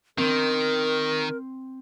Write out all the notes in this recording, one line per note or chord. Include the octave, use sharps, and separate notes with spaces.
D#3 C4 A#4